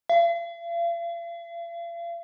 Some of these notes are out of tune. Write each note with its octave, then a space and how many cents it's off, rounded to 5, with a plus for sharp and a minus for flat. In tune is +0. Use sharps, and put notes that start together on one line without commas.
F5 -45